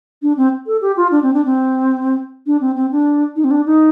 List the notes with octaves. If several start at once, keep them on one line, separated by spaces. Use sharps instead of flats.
D4
C4
A4
G4
F4
D4
C4
D4
C4
D4
C4
C4
D4
D#4
C4
D4
D#4